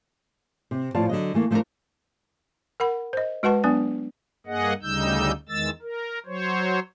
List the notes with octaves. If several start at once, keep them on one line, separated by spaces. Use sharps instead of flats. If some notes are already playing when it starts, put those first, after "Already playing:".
C3
A2 F3 F4 D5 F5 A5
D3 F#3 D#5
E3 A3 A#3
F3 A3 B3 C4 D4 A#4
A#4 F#5 B5
C5 D#5
G#3 F#4 B4 F#5 A5 C#6
F#3 B3 D4 G#5
G2 A#3 G#4 D#5 F#5
D2 C#3 G3 D#4 E6 G6
E2 D#3 G#3 E6 A6
A#4
F#3 C5 C#5